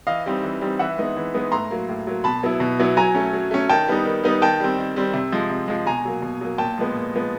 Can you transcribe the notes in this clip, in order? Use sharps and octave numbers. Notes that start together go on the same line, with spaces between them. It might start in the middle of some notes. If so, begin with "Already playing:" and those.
E3 D#5 F5
G3 C4 D#4
E3
G3 C4 D#4
E3 E5 F#5
G#3 B3 D#4
E3
G#3 B3 D#4
A2 A#5 C6
F#3 A#3
A2
F#3 A#3
B2 A5 B5
F#3 B3 E4
B2
F#3 B3 E4
F#3 G#5 A#5
A3 C#4
F#3
A3 C#4
D#3 G5 A5
G3 B3 D#4
D#3
G3 B3 D#4
D#3 G5 A5
G3 C4
D#3
G3 C4
C3
F3 G#3
C3
F3 G#3
B2 G#5 A#5
F#3 A#3
B2
F#3 A#3
A#2 G5 A5
F3 G#3 B3
A#2
F3 G#3 B3